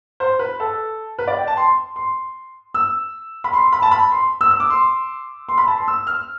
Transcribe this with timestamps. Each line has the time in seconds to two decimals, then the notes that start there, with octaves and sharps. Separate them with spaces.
0.20 C5
0.39 B4
0.60 A4
1.19 B4
1.27 D5
1.37 G5
1.47 A5
1.57 C6
1.96 C6
2.74 E6
3.44 B5
3.53 C6
3.72 B5
3.82 A5
3.91 B5
4.11 C6
4.41 E6
4.51 E6
4.60 D6
4.70 C6
5.49 C6
5.58 B5
5.68 A5
5.77 C6
5.88 E6
6.07 F6